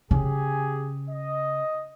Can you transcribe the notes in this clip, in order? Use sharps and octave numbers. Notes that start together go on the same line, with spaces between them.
C#3 G4 G#4 G#5
D#5